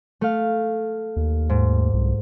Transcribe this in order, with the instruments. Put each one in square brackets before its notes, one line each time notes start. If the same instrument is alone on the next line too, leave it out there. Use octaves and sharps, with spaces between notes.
[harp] A3 F5
[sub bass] D#2
[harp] G#2
[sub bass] C2